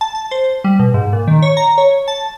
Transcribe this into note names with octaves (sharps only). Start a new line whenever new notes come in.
A5
A5
C5
G3
B2
G#2
A#2
D#3
C#5
A#5
C#5
A5